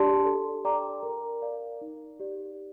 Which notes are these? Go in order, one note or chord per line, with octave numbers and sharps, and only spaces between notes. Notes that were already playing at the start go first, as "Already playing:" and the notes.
Already playing: D4 G4 D5 A5 C6
A4
D5 G5 A#5 D6
A#4
D5 F5
D#4
G4 D5